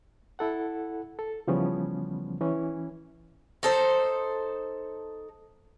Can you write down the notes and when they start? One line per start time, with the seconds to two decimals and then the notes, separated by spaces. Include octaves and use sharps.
0.39 E4 A4 F#5
1.19 A4
1.47 C#3 E3 F3 G3 B3 C#4
2.41 E3 C#4
3.63 D#4 A4 C5